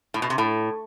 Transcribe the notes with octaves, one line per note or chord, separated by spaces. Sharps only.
A2
B2
C3
A2